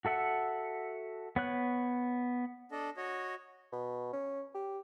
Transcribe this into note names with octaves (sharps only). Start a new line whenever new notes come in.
F#4 A4 E5 F#5
B3 C#5 F#6
D4 A4 D#5
F#4 C#5 D#5
B2
C#4
G4